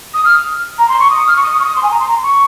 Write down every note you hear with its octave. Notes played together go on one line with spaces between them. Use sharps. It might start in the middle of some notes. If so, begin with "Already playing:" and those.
D#6
F6
A#5
C6
C#6
D#6
F6
C#6
D#6
C#6
D#6
C6
G#5
A#5
C6
A#5
C6
C#6